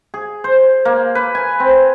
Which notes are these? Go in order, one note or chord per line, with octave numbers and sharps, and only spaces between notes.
G#4
C5
A#3
B4
G#5
C4